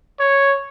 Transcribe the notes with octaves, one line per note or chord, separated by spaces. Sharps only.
C#5